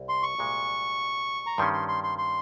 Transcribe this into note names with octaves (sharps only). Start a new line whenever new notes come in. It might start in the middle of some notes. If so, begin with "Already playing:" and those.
Already playing: C2
C6
C#6
C2 A#2 G#3
A#5
G2 D#3 G3 C#4 C6
C6
C6
C6
C6